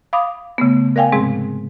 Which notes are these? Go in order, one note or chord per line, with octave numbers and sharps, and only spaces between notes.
F5 B5 D6 D#6
C#3 A3 B3
A#4 D5 F5 G5 G#5
G#2 C3 F3 G#3 C4 G#4